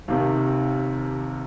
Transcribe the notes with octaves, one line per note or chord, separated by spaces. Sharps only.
D#2 C3 D#3